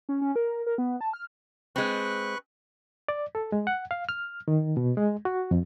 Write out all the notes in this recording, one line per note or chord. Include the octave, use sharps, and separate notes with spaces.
C#4
C#4
A#4
A#4
B3
A5
F6
G#3 C4 B4 C#6 F#6
D5
A4
G#3
F#5
F5
F6
D#3
B2
G#3
F#4
F2